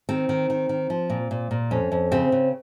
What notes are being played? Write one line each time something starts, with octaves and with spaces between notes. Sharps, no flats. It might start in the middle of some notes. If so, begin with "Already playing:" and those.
D#3 C4
D#3
D#3
D#3
F3
A#2
A#2
A#2
F2 C#4
F2
C#3 C4
C#3